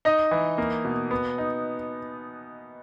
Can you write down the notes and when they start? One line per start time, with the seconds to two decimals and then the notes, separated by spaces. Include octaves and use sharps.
0.05 D#4 D#5
0.31 E3
0.58 A#3
0.85 B2
1.11 B3
1.38 D#4